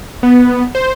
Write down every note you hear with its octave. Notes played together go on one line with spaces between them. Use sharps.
B3
C5